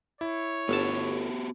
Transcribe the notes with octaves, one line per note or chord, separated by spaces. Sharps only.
E4 C#5
G1 B3 F#4 G4 A5